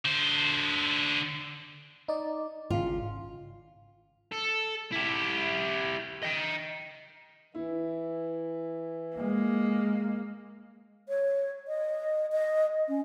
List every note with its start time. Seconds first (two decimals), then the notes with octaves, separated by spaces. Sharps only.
0.05 D3 C5
2.08 D#4 D5
2.70 G#1 C#3 F4
4.32 A4
4.92 E4 G4
6.23 D#5 G5
7.55 E3 E4
9.17 G#3 A#3
11.09 C#5
11.68 D#5
12.32 D#5
12.88 C#4